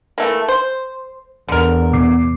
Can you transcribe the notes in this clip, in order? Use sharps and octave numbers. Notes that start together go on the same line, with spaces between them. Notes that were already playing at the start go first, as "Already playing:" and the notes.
E3 A3 A#3
C5
E2 D3 A#4
B2 D6 C7